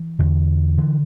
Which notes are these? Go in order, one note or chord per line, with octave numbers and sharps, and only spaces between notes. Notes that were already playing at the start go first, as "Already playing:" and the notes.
Already playing: E3
E2 D3
D3 E3